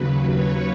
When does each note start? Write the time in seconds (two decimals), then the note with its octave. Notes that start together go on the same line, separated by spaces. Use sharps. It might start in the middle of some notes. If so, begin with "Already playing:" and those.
Already playing: D#2 C#3 F#3 B4
0.33 C#5